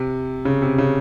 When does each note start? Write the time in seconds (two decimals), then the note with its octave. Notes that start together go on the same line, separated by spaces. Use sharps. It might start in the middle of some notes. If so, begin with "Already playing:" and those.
Already playing: C3
0.45 C#3
0.62 C3
0.78 C#3